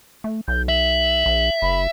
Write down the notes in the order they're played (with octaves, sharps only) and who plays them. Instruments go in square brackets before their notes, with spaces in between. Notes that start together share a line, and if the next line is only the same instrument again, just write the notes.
[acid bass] A3
[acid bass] B1 [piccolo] G6
[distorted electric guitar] E5 [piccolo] F#7
[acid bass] A#1
[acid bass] F#1 [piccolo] B5